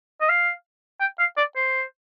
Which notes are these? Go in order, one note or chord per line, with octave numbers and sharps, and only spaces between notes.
D#5
F5
G5
F5
D5
C5